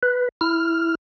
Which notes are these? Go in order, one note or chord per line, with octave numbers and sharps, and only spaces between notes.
B4
E4 F6